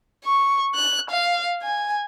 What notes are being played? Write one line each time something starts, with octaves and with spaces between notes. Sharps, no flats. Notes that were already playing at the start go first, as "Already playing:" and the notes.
C#6
F#6
F5
G#5